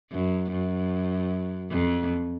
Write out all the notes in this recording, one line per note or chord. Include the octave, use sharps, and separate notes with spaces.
F#2
F#2
F2